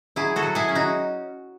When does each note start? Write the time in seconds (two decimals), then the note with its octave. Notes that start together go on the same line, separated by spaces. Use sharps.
0.16 F#3 E4 G#4
0.36 F#4 A4
0.43 F#3
0.55 E4 G#4
0.69 C#4
0.75 D#4 F#4